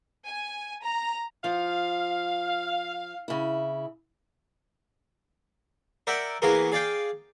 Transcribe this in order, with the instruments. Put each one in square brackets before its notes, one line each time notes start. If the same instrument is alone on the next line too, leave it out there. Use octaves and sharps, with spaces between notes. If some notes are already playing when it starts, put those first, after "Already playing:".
[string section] G#5
A#5
[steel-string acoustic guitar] F3 [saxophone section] F5
[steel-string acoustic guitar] C#3 E4
[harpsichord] A#4 D5 E5 F#5 G5
E3 A#3 B3 F#4 G#4 A#4
G#4 D5 F5 G5